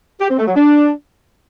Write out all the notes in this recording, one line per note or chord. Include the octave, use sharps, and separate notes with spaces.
G4
C4
A3
F#3
D4